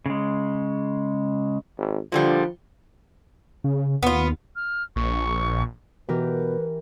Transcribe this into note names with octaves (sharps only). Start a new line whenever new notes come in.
C#3 G#3
G#1
A#2 D3 F3 G3
C#3
D#2 B3 F4
F6
A#1 C#6
B2 E3 G4 A#4 B4